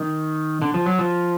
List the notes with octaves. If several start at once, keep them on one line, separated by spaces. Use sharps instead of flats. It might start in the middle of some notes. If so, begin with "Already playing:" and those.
Already playing: D#3
D3
F3
F#3
F3